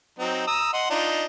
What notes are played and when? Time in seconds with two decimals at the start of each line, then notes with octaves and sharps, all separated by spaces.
0.19 F#3 C4 D#4
0.47 A#5 D#6 E6
0.73 D#5 F#5 C6
0.90 D4 D#4 F4